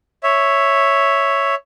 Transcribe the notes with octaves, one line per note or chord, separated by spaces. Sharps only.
C#5 E5